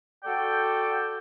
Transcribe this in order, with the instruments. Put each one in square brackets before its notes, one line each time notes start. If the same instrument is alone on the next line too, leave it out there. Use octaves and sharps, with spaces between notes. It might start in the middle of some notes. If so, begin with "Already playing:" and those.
[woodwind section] F#4 A4 D5 G5